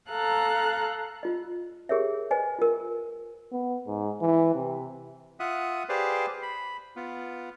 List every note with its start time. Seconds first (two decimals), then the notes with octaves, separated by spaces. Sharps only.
0.10 A4 F5 A#5 F#6
1.23 F4 D#5
1.89 G4 G#4 A#4 C#5 E5
2.31 B4 C5 D#5 G#5
2.59 F4 A#4
3.52 B3
3.87 G#2
4.21 E3
4.55 C3
5.40 F4 E5 F#5 D#6
5.89 G4 G#4 B4 C5 D5 F5
6.43 B5
6.96 B3 F4